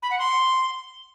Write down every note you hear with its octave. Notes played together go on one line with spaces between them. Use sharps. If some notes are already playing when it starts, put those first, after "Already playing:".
B5
F#5
C6